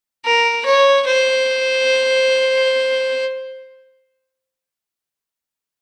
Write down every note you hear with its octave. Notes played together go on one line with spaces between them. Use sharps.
A#4
C#5
C5